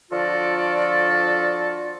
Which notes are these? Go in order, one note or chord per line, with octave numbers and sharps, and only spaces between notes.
D3 F3 F4 F#4 A4 D5